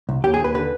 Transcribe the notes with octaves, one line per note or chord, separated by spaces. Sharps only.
C2
D#2 G4
G#4
D#2 B4
D3 B4